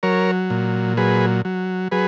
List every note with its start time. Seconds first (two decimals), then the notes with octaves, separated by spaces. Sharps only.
0.03 F#3 A#4 C#5
0.50 A#2
0.97 F#3 G#4 B4
1.45 F#3
1.91 F#3 G#4 B4